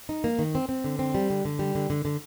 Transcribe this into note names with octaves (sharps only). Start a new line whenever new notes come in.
D#4
A#3
D#3
C4
C4
D3
C4
G3
D3
D3
G3
D3
D3
D3